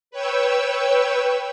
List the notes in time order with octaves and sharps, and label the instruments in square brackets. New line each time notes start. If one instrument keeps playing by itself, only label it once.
[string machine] B4 C#5 G5 E6